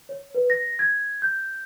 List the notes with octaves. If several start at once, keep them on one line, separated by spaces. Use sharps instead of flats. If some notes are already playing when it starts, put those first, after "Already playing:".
C#5
B4
A#6
G#6
G6